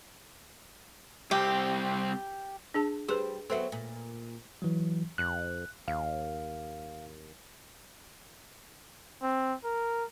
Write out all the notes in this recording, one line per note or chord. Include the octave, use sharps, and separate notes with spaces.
C2 C4 G4
D4 G#4 A5
G3 G#4 B4 C5
F#3 B3 C4 A4 B4 E5
A#2
E3 F#3
F2 F#6
D#2 F5
C4
A#4